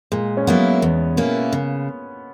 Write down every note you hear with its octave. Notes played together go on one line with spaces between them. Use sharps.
A#2 G#3
C#4
F#3 A#3 B3 E4
E2
B2 A#3 C#4 E4
C#3